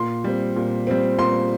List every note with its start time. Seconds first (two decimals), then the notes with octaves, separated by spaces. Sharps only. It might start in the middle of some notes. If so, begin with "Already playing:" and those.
Already playing: A#2 C6
0.24 G3 C4
0.56 A#2
0.87 G3 C4
1.18 A#2 C6